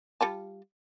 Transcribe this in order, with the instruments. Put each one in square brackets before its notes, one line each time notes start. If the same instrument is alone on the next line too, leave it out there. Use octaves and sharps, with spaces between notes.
[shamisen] G3 F4 A5